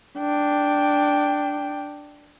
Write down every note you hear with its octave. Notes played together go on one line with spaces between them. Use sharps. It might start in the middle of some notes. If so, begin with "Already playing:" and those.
D4 G5